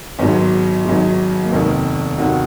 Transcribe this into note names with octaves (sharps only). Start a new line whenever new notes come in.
G#1 G#2 F#3 B3
G#1 G#2 F#3
A#3
F1 D#2 D#3 B3
F1 D#2 D#3 F#4